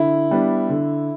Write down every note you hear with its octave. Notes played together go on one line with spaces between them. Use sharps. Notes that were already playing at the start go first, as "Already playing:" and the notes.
Already playing: D3 E4
G3 B3 D4
D3